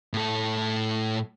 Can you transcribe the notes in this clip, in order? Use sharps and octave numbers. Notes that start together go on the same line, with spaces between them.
A2 A4